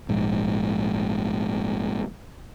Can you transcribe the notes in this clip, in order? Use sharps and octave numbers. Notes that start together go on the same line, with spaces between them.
A#1 G#2